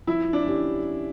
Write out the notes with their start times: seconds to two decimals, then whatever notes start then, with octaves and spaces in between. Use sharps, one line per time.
0.07 F3 E4
0.33 D4
0.46 C#4 E4 G4